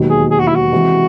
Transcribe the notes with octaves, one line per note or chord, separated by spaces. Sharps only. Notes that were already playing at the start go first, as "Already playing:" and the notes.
Already playing: E1 D#2 D#3 F#3
G#4
G#4
F#4
E4
F#4
C3 E3 G#3 C4